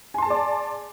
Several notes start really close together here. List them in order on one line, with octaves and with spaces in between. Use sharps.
G#5 C6 A5 G#4 D5